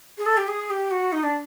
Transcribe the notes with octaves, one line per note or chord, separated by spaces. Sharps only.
G#4
A4
G4
G#4
G4
F#4
D#4
D4